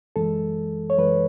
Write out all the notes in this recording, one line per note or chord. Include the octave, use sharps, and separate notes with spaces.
F#2 E3 G#3 A4
C#5
F#2 E3 G#3 B4